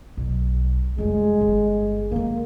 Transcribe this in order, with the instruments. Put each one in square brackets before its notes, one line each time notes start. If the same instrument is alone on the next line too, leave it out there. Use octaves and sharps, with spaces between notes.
[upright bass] B1
[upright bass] F1 G3 [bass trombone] G#3
[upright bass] G1 D3
[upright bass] D3 G#3 [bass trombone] A#3